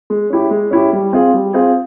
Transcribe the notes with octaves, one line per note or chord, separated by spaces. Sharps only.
G#3
C#4 E4 G4
G#3
C#4 E4 G4
G3
C4 F4 G#4
G3
C4 F4 G#4